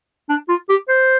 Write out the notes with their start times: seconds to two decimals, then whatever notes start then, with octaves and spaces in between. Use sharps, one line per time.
0.29 D4
0.49 F4
0.69 G4
0.88 C5